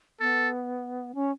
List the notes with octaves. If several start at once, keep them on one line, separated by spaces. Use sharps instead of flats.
B3 A4
C#4